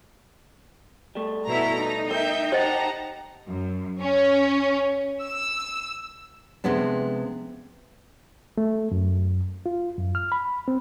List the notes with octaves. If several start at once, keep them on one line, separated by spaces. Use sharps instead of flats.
G3 A3
B2 E4 A4 A#5
D#4
A#4 E5 G5 G6
G4 C5 D#5 F#5 G5 A5 A#5
F#2
C#4
E6
C3 F3 G#3 B3 D4
A3
F#2
F4
F#2
F6
B5
C4